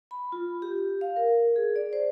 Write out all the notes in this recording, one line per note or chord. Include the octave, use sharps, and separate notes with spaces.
B5
F4
G4
F5
A#4
G#4
D5
C5